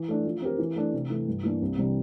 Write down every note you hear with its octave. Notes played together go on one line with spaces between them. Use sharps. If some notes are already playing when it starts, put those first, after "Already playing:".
Already playing: E3
A3 D4
F3
C4 G4 A#4
E3
A3 D4
C3
E3 A3
G2
E3 A#3 D4
C2
C3 E3 G3 D4